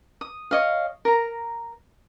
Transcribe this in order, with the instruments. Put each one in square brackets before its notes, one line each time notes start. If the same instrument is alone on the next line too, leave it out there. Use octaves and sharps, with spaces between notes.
[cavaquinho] D#6
C#5 D#5 F5
A#4 A#5